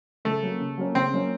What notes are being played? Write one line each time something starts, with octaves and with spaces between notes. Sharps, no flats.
C#3 A3
F#3 A#3 C#4
C#3
F#3 A#3 C#4
C#3 C4
F#3 A#3 C#4